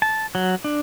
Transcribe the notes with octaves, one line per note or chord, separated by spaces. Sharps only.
A5
F#3
D4